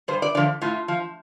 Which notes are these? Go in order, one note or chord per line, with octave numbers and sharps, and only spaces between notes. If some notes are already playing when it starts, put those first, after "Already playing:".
G2 C5
D5
D3 F3 D5
A2 F4
F3